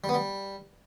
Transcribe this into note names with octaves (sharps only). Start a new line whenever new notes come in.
G3
B3
G3